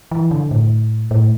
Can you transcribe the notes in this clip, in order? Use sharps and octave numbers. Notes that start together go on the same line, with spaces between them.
E3
D3
A2
A2